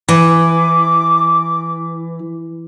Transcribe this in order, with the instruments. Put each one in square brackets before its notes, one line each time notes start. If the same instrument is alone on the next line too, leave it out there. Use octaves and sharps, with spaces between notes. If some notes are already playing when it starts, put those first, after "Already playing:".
[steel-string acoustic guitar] E3 [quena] D6